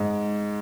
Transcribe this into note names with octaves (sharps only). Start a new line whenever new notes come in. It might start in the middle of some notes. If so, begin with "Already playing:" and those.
Already playing: G#2 G#3